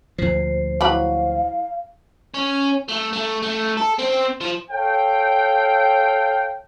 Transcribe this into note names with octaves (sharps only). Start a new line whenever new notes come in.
D2 A#2 F3 C5
E3 F#3 F5 B5
C#4
A3
A3
A3
A4
C4
F3
A4 C#5 F5 G5